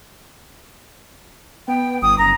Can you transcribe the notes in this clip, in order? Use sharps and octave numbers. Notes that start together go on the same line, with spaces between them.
B3 G5
G1 D#6
F#1 A#5